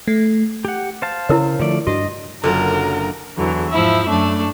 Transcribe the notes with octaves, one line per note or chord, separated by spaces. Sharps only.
A3
G4 F#5
C5 F5 A5
C#3 E4 A#4 C#5
D3 F3 A3 D5
G2 D4 F#4 D#5
F#1 D3 F#3 F4 A#4
E2 D3 E3 F#3
G#2 F3 E4 E5
F#2 A3 D4